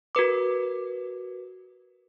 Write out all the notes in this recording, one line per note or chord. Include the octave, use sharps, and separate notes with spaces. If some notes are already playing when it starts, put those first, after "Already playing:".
F#4 A#4 B4 D6